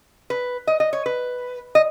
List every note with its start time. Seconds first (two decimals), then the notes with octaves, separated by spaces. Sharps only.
0.30 B4
0.67 D#5
0.80 D#5
0.93 C#5
1.06 B4
1.75 D#5